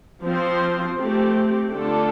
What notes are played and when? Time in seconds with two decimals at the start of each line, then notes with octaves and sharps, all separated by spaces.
0.23 F3 C4 F4 C5
0.98 A3 C4 G4
1.73 D3 A3 D4 F4 A4